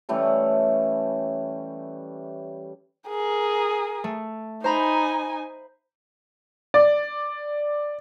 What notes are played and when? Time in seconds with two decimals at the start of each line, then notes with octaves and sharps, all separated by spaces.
0.09 E3 G3 A3 C#4
3.09 G#4 A#4
4.04 A3
4.64 D#4 C5 G#5 A#5 B5
6.74 D5